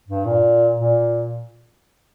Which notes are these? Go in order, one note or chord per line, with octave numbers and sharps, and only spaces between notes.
G2
A#2
A#2